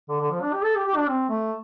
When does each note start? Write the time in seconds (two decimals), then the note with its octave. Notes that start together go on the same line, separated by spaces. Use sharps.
0.09 D3
0.20 D3
0.31 F3
0.42 D4
0.53 G4
0.64 A4
0.75 G4
0.86 G4
0.96 D4
1.08 C4
1.29 A3